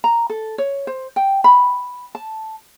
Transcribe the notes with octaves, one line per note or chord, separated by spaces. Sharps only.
A#5
A4
C#5
C5
G5
B5
A5